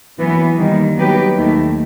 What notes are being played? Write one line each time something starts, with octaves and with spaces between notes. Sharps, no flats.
F#2 E3 B3
D#2 D#3 G3
F#3 B3 D#4 G4 B4
D#2 D#3 A3